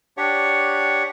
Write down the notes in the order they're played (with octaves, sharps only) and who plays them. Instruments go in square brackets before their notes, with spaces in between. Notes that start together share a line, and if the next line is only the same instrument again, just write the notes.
[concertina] D4 G4 C#5 F#5